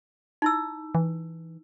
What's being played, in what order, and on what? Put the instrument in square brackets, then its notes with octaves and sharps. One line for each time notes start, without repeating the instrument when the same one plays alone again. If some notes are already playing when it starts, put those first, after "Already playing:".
[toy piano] D#4 E4 E6
[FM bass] E3